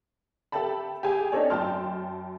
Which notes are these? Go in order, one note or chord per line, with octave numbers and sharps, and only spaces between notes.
G4 A4 E5 G5 A5 B5
G4 G#4 G#5
C4 D4 D#4 A4 C#5 D5
F#2 G5 A5 C6 F6